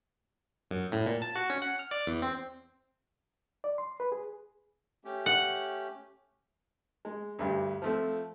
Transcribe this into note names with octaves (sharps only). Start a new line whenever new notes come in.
F#2
A2
A#2
A5
F#4
C#4
F#5
F6
D5
E2
C4
D5
C6
B4
G#4
A3 C#4 G4
F#5
G#3
D2 G2
F3 A3 C4